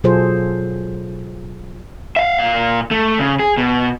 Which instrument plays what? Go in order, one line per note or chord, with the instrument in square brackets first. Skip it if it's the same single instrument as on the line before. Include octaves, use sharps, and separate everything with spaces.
[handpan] B2 F#3 F4 G#4 A4 C5
[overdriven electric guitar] E5 F5
A#2 F5
A3
C#3
G#4
B2